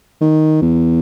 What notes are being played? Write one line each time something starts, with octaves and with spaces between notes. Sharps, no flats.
D#3
E2